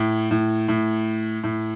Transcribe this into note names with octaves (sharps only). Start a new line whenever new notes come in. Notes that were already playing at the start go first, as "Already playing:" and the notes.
Already playing: A2
A2
A2
A2